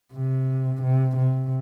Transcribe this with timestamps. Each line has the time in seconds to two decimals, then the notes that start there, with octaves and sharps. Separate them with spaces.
0.13 C3
0.83 C3
1.16 C3